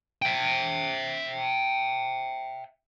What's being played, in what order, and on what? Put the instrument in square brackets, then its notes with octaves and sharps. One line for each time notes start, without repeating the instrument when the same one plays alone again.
[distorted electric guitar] E5 G5